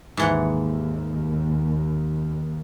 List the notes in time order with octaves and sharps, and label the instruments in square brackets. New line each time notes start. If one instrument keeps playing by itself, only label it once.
[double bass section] D#2 [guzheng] G#2 E3 F#5